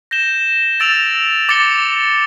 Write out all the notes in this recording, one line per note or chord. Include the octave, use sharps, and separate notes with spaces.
G6 A#6 E7 G7
E6 A6 D7 F7
D6 A6 C#7 G7